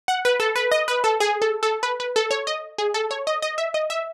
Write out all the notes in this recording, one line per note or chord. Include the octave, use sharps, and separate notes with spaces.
F#5
B4
A4
B4
D#5
B4
A4
G#4
A4
A4
B4
B4
A4
C#5
D#5
G#4
A4
C#5
D#5
D#5
E5
D#5
E5